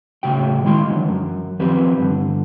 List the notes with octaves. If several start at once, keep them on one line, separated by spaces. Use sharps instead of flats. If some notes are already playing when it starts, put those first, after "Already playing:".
A2 C#3 F#4 G5
D#3 G#3 E4 C6
D3 E3 F#3
F#2 F#3
D#2 F3 C4 G4 B4
G2 D3